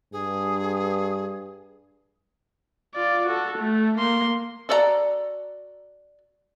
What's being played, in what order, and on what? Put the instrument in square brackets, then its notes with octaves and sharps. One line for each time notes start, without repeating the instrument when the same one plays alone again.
[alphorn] G2 [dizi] G#4
[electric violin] F4 D5
F#4 A4
A3
A#3 C6
[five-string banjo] F#4 A4 D5 E5 A#5